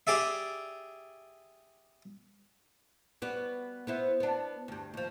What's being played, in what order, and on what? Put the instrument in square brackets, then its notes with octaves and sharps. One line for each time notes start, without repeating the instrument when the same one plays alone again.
[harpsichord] G4 G#4 D5 E5
[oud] G3 B3 F#4
B3 E4 C5
B3 D4
D2 G2
D#2 F3